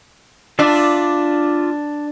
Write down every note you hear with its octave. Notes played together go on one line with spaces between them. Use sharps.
D4 F4 D5 E5